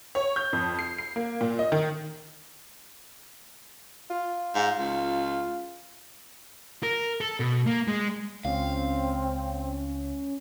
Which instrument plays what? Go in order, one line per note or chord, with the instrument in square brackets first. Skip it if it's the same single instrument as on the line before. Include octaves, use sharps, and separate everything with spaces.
[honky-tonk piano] C#5
G6
F2
C7
C7
A#3
A#2
D#5
D#3
[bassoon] F4
[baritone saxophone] G#2
C#2
[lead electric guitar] A#4
A4
B2
A#3
G#3
[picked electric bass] C#2 [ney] C4 [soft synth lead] C#4 [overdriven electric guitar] F5